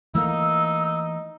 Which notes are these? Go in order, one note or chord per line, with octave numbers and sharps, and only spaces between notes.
E3 A3 A#3 D#4 E6